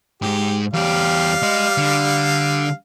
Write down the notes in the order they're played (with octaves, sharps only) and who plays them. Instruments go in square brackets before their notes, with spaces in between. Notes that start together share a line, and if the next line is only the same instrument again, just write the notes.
[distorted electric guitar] G#2 G#3 [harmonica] G4
[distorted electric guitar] E2 G4 [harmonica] G3 F5
[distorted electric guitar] G#3 D#5
D3